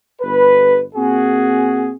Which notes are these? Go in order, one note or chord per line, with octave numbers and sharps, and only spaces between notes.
G1 B4
A#2 C4 F#4 G#4